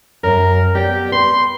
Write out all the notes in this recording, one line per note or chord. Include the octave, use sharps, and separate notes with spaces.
F#2 F#3 A#4
B3 G4 D5
B4 C6